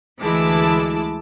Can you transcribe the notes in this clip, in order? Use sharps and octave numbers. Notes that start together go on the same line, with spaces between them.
D2 E3 G#3 E4 A5 D6